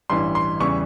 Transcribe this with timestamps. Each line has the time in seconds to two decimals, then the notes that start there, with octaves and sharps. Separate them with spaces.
0.10 A1 G2 E3 G3 C6
0.35 C6
0.60 E2 C#3 E3 G3 C#6